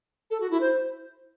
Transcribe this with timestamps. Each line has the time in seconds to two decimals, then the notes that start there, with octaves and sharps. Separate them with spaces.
0.30 A4
0.40 F#4
0.50 E4
0.60 C5